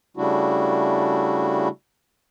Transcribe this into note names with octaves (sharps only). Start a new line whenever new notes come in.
C#3 G3 A3 D4 E4 F#4